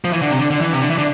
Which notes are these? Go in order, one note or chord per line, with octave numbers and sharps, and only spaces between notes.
F3
E3
D3
C3
D3
D3
E3
C3
D3
E3
D3